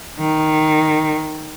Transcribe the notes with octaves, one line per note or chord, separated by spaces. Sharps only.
D#3